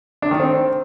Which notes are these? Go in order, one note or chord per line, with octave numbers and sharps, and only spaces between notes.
D4
D#3
C4